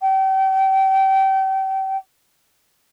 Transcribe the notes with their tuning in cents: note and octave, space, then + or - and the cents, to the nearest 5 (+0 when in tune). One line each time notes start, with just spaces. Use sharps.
G5 -35